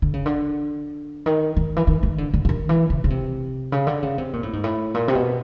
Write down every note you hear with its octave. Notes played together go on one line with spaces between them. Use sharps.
D3
C#3
D3
D#3
D#3
E3
D#3
D#3
D3
D3
D3
D#3
E3
C#3
C#3
C3
C#3
D3
C#3
C3
A#2
A2
G#2
A2
A#2
C3
B2